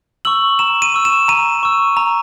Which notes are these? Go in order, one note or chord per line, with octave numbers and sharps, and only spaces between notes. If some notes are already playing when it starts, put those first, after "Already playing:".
C#6 E6 F#7
A#5 E7
D#7
C#6 E6
E7
A#5 D#7
C#6 E6
A#5